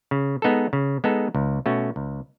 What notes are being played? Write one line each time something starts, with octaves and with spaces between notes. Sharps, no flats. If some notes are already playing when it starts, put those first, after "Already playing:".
C#3
G#3 B3 D#4 A4
C#3
G#3 B3 D#4 A4
C#2
B2 A3 C#4 F#4
C#2